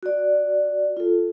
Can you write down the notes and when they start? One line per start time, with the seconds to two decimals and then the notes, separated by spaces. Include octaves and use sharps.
0.03 F#4 D5
0.97 F4 A4